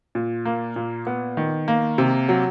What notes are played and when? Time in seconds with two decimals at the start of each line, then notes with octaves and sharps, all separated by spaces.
0.15 A#2
0.45 A#3
0.76 A#2
1.07 B3
1.37 D#3
1.68 A#3
1.98 C3
2.29 F#3